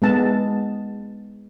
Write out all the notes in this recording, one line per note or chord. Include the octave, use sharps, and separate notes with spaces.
G#3 B3 A5